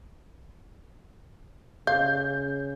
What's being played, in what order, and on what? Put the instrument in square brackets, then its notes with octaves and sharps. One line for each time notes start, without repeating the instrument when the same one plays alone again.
[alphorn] C#3 [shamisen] F5 [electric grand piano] G6